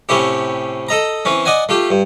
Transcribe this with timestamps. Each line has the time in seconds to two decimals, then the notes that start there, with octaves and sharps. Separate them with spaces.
0.09 A2 C3 C#4 E4 G4
0.89 A4 D#5 A#5
1.25 E3 C4 C#4
1.45 D5 D#5 F#5 G#5
1.69 A3 F4 G4
1.91 G2